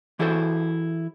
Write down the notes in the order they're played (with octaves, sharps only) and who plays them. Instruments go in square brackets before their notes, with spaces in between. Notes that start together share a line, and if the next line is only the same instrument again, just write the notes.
[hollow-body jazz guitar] E3 E4 F#4 G#4 A4 C5